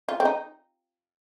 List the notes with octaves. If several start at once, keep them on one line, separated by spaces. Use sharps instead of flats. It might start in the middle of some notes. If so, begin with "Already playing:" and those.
F4
C4
D#4